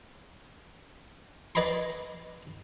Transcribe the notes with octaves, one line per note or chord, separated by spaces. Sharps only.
B4 D5 D#5 G#5 B5 C6